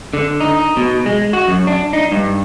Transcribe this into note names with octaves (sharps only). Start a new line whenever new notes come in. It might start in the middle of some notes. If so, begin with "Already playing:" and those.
D3
D#4
B2
G#3
F#4
F#2
D4
D#4
G2